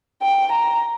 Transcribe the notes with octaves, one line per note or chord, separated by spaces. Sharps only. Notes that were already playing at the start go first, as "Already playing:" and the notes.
G5
A#5